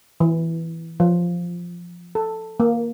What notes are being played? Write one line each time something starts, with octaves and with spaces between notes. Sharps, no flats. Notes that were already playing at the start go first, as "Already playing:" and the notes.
E3
F3
A4
A#3